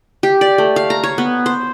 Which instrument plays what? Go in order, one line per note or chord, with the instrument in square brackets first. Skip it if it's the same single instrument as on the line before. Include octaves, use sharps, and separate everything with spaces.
[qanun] G4
D5
A3
F5
A#5
C#5
B3
C5